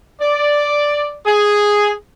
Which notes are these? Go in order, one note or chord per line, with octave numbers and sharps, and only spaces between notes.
D5
G#4